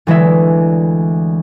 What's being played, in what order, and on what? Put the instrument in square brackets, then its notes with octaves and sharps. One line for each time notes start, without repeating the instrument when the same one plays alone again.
[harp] D2 E3 G#3 E5